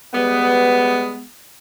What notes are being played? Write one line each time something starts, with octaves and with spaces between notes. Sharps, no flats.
G3 G#3 B3